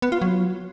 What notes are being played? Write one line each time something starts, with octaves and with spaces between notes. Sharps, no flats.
B3
F4
F#3